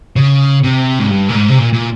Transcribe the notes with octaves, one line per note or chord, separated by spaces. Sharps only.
C#3
C3
G#2
G2
A#2
G#2
C3
A#2
A#2